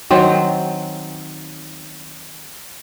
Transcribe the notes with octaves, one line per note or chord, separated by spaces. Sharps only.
D#3 F#3 C4